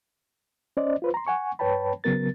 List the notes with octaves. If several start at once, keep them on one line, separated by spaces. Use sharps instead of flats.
C#4 C5 D5 D#5
F4 B4 C5
A#5 C6
F#5 G#5 C#6
G2 B4 C#5 G5 A5 B5
C#3 F#3 B3 A#4 A6